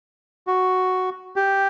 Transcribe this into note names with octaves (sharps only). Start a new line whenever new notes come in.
F#4
G4